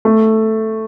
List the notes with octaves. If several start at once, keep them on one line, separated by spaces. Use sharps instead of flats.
A3